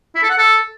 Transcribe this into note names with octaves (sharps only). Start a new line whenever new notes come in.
E4
A4
F#5
A4